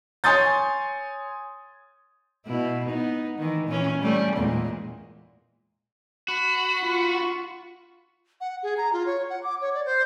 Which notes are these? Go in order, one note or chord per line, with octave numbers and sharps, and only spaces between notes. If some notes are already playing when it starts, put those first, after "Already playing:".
C#5 G#5 C6 D#6 G6 A6
B2 E4
B3 D#4
D#3 E3
A#2 E3 C#4
G3 A3 C#4
E2 A#2 G#3
F#4 B5
F4 C#6
F#5
G#4
A#5
F4
C#5
F#5
D6
C#5
D5
C5